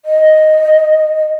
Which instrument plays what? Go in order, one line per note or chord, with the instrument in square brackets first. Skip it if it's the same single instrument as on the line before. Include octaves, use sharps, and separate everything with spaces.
[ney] D#5